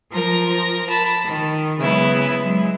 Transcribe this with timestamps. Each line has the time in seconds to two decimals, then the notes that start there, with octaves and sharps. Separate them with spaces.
0.12 F3 A#4 A#6
0.90 A5 B5
1.26 D#3
1.78 C#3 F#3 G#3 B3 E4 B4
2.40 F#3 G#3